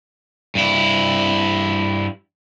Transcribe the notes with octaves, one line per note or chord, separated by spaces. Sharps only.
G2 E4